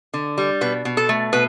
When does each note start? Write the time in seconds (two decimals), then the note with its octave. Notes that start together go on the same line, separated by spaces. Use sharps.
0.14 D3
0.38 G3
0.61 B2 B4
0.85 B2
0.97 A4
1.09 A3
1.33 B2 B4